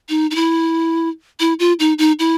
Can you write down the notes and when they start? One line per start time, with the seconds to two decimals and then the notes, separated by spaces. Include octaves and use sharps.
0.09 D#4
0.31 D#4
0.36 E4
1.40 E4
1.59 F4
1.80 D#4
1.99 D#4
2.19 E4